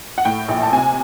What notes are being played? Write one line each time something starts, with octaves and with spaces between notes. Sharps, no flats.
F#5
A2 G5
A#1
A5
C3 G#5